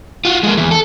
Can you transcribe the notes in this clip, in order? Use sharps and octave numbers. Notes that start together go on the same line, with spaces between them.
F4 F#4
G#3 A#3
E2 E3
A4